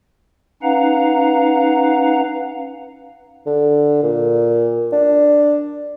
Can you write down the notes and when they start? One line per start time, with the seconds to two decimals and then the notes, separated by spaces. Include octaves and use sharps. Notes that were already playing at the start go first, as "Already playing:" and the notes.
0.63 C#4 D#4 B4 F5 F#5 A#5
3.46 D3
4.03 A#2
4.92 D4